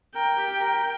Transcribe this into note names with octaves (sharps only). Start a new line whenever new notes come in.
A#4 G5
G4
A#4